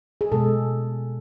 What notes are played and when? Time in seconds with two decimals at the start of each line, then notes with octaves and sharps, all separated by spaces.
0.21 G#4
0.32 B2 G#3 A4